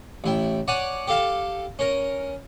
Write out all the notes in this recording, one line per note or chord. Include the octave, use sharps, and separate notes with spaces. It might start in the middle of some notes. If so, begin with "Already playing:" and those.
A1 E4 G5
C#5 D5 F#5 G#5
G4 A4 F5 A5
C#4 A#4